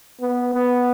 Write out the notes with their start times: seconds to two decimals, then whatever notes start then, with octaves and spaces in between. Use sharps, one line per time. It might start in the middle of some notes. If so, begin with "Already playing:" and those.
0.20 B3
0.53 B3